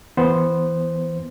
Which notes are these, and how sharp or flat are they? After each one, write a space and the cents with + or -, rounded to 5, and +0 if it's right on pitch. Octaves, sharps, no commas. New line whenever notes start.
E3 +0 B3 +0 C5 -5